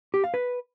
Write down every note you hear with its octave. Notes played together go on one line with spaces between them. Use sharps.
G4
F5
B4